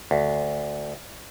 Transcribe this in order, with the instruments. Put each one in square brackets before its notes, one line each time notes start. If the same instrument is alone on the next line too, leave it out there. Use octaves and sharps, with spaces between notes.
[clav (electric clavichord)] D2